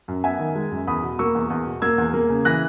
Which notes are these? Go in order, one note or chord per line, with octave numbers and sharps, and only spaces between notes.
F#2
B3 E5 G#5
D#3
G#3
F#2
E2 B5 D#6
B2
A#3 C#6 E6
E2
E2
B2
A#3 E6 G#6
E2
A#3
C#3
E3 F#6 A#6